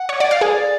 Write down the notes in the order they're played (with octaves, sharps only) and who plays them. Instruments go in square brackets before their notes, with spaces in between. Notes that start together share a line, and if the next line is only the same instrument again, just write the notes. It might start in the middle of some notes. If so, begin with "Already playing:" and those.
Already playing: [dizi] F#5
[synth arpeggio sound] C#5
D5
F5
G#4
[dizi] D5